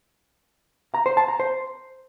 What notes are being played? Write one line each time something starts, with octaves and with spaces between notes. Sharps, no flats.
A#5
C5
A5
A#5
C5